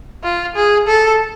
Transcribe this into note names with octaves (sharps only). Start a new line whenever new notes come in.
F4
G#4
A4